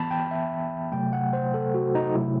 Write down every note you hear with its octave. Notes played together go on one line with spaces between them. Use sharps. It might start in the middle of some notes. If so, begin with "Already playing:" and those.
Already playing: E3 B3 A5 B5
G5
E5
C3 F#3 A3 G5
F#5
C5
A4
F#4
D#4
C3 F#3 A3 E4